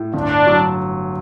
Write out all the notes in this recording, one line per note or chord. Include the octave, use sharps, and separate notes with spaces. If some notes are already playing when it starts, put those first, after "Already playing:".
Already playing: A2
G1 D4
F#3